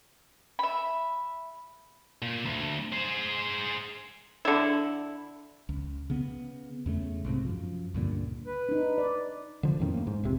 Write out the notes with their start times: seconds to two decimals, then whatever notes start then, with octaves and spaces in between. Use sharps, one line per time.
0.59 E5 B5
2.22 A#2
2.45 D2
2.92 G#4 C5
4.45 D3 E4
5.69 C#2
6.10 C#3 B3
6.86 E2 C#3 A3
7.25 B1 G#2 C3
7.45 F#2 F3
7.94 C#2 G2 A#2 D3
8.47 B4
8.69 D4 D#4
8.98 D5
9.63 D3 F3
9.80 E2 A2 D#3 C#4
9.94 A2 A#3
10.07 G#2
10.24 F1 A#1 C3